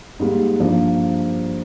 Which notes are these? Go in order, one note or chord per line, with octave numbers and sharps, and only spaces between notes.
G#2 G3 A#3
G2 F3 A#3